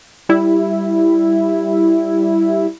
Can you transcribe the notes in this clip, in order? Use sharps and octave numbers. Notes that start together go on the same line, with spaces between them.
G3 E4